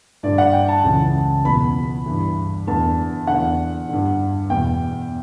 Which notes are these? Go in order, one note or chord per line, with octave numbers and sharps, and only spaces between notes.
G2 D3 D5
F#5
G5
A5
C#2 C#3 E3
E2 B2 B5
G2 E3
E2 D3 A5
D3 F#5
E2
G2 D3
E2 B2 G5